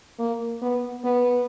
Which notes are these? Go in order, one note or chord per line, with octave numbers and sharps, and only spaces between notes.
A#3
B3
B3